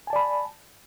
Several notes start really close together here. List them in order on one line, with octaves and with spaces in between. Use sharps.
G#5 A5 D5 B5